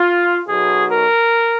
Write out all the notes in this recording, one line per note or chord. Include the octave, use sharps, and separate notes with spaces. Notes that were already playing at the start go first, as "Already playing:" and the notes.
Already playing: F4
B1 B2 F#3 G#4
A#4